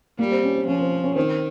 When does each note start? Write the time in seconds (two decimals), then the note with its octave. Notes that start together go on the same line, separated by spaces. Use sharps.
0.19 G3 A#3
0.31 C4
0.44 C#4
0.56 C4
0.67 F3 C#4
0.80 C4
1.04 C#4
1.16 D#3 C4